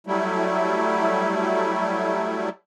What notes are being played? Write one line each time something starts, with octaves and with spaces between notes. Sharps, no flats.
F#3 G3 A3 E4